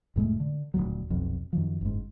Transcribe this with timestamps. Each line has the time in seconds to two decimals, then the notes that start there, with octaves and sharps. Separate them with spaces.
0.16 F1 A2 G#3 A3
0.40 D3
0.74 D#1 G#1 D2 F#3
1.10 D#1 B1 F2
1.53 F#2 D#3 F3
1.81 F#1 G#2